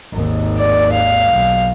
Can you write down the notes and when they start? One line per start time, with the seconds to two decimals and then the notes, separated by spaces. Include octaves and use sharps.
0.12 G#1 D#2
0.58 D5
0.93 F5
1.32 B1